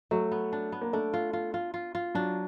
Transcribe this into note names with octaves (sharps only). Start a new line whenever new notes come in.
F#3 A3
B3
D4
B3
A#3
A3 D4
F4
F4
F4
F4
F4
F#3 D4